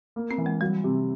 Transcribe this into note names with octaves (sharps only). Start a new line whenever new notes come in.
A#3
C4
E3
G#3
F#3 G3
C3